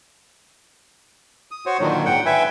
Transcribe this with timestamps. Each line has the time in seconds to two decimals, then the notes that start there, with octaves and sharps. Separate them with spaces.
1.51 D#6
1.66 F#4 C5 C#5
1.80 A#2 D3 D#3 F#3
2.06 G#2 F#5 G5
2.26 B4 E5 G5 G#5